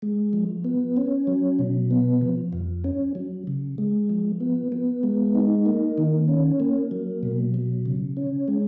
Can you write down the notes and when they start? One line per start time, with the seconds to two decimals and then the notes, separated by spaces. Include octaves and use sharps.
0.02 G#3
0.33 F3
0.64 B3
0.97 C#4
1.27 F#3
1.59 B2
1.91 B3
2.21 F3
2.53 F2
2.84 C#4
3.15 F#3
3.47 C#3
3.78 G#3
4.09 F3
4.40 B3
4.72 B3
5.03 G#3
5.35 D#4
5.66 A#3
5.98 D#3
6.28 C#4
6.60 A#3
6.91 F#3
7.23 B2
7.54 F#3
7.86 C#3
8.17 C#4
8.48 G#3